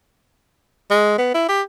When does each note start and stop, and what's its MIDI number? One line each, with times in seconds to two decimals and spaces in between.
0.91 1.18 56
1.18 1.30 59
1.35 1.47 64
1.49 1.62 67